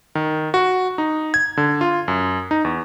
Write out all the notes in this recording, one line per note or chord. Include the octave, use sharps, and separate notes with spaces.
D#3
F#4
D#4
G#6
D3
F4
F#2
D#4
E2